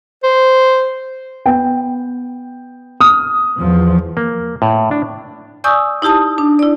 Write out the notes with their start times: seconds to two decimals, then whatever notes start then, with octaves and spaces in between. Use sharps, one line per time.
0.23 C5
1.46 B3 G5
3.01 D#6 F6
3.59 E2 F3
4.17 A#3
4.62 A2
4.91 D4
5.64 D5 G#5 C#6 D#6 E6 G6
6.02 D#4 E4 G4 A5 D#6
6.38 D4
6.59 E4 D5